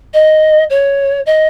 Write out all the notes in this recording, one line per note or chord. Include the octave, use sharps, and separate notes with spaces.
D#5
C#5
D#5